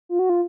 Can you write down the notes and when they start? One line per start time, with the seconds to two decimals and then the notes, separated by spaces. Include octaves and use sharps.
0.09 F4
0.19 F#4
0.29 F4